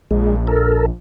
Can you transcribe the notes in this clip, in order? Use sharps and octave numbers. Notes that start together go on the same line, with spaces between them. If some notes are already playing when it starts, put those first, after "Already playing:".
A#1 G#3
A4 A#4